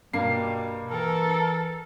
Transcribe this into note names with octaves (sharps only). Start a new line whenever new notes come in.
G2 B2 G3 A#3 C7
E3 A4 A#4